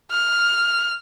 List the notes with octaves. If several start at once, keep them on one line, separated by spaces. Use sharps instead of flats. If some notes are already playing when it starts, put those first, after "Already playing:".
F6